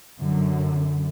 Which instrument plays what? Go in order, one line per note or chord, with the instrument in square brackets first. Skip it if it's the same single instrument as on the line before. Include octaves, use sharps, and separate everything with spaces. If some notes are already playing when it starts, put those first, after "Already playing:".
[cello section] F#2 [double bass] D3